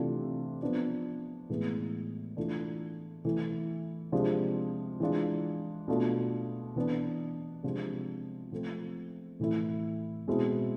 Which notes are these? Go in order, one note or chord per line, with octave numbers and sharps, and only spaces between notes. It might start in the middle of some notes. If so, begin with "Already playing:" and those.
Already playing: C3 E3 A3 D4 F4
F3 B3 D4 F4
A2 E3 G#3 B3
E3 A3 D4 F4
E3 A3 E4
C3 F3 G#3 D4 F4
E3 G#3 D4 F4
B2 A3 D4 F4
E3 B3 D4
C3 F3 G#3 D4 F4
F3 A3 C4
A2 E3 A3 E4
B2 G#3 C4 E4